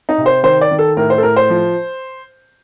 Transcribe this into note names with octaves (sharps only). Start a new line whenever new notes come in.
D#4
C3
C5
D#3 C5
D5
D#3
A4
A2 A#4
C5
A4
A2 A#4
C5
F3